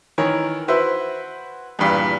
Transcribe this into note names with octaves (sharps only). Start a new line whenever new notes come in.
D#3 E3 A#4 C#5
E4 F#4 B4 C5 E5 F#5
E2 G2 A#2